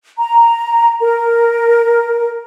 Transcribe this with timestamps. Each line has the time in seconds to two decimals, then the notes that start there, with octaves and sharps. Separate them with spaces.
0.18 A#5
1.00 A#4